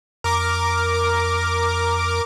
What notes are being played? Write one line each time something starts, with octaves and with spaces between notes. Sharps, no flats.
F2 A#4 D6